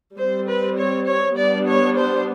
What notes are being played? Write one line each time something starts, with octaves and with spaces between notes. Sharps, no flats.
G3 C4 C5
B4
C#5
C#5
G3 B3 D4 D5
C#5
C5